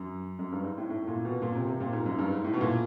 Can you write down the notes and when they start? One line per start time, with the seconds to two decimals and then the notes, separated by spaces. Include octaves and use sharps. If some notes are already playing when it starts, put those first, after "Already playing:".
Already playing: F#2
0.39 F#2
0.52 G2
0.64 G#2
0.78 A2
0.90 A2
1.07 A#2
1.25 B2
1.42 A#2
1.55 C3
1.67 C3
1.80 A#2
1.93 G#2
2.06 F#2
2.19 G2
2.32 G#2
2.44 A2
2.53 B2
2.61 A#2